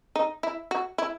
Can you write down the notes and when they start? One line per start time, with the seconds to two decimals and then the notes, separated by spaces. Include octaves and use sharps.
0.16 D#4
0.43 E4
0.71 F#4
0.98 E4